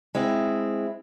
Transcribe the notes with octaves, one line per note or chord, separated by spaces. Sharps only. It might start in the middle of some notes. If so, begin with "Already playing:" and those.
G#3 C4 E4